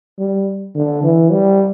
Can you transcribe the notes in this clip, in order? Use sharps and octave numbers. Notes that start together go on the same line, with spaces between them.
G3
D3
E3
G3